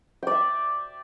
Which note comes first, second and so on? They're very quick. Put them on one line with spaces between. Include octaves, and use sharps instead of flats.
G5 D5 E5